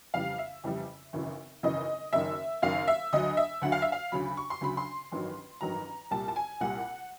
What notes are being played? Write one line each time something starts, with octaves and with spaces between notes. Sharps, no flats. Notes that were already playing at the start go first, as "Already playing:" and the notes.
F2 C#3 E3 G3 F5
E5
F2 C#3 E3 G3
G#1 F#2 C#3 E3
G#1 F#2 C#3 E3 D#5
F#1 F#2 D#3 E5
F#1 F#2 D#3 F5
E5
D2 D3 F#3 D#5
E5
D2 D3 F#3 F#5
F5
E5
F5
D2 C#3 F#3 B5
C#6
C6
D2 C#3 F#3 B5
C6
A1 G2 D#3 F#3
A1 G2 D#3 F#3 A#5
C2 A#2 G3 A5
A5
G#5
C2 A#2 G3 F#5